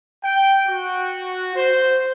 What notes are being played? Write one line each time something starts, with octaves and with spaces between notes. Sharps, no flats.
G5
F#4
C5